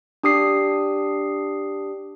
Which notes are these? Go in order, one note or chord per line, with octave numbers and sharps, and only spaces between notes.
D4 G4 D#6 C7